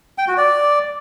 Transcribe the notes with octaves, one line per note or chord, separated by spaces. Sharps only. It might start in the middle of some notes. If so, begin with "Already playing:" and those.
G5
F#4
D5